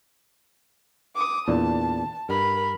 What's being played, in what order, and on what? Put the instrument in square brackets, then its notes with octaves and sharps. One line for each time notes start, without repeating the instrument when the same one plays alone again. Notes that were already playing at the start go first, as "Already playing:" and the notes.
[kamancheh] D6 D#6
[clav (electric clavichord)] E2 A#2 D4 [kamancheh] A5
[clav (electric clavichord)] G2 [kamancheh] A#4 B5